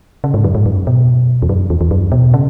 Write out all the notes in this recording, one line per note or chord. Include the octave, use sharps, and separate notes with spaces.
C#3
G#2
F#2
G#2
F#2
B2
E2
F#2
E2
E2
F#2
B2
C#3